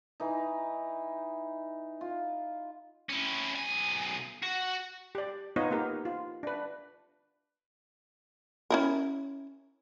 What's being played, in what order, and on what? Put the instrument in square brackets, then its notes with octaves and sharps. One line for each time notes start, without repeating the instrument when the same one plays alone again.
[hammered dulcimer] E3 D#4
F4
[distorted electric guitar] C#4 E4
B1 G#5
F#4
[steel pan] G4 D5
B3 D#4 F4 C#5 D#5
A#3 B3 G4 A#4
F4
D4 B4
[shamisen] C#4 E4 A#4